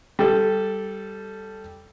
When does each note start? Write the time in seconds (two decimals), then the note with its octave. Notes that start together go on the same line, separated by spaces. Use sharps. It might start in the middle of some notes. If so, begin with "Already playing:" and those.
0.19 G3 A4